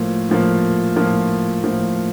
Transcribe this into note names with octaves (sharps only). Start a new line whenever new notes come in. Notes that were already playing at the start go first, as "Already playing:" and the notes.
Already playing: A2 F3 A#3
A2 F3 A#3
A2 F3 A#3
A2 F3 A#3